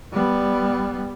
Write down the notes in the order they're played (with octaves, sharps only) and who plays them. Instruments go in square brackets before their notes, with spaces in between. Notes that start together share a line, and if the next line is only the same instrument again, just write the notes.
[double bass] G3 B3